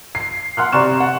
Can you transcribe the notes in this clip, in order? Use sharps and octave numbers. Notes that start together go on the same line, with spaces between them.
C7
F#5 C6 F6 F#6
C3 D5 A#5 C6 C#6 E7
F#5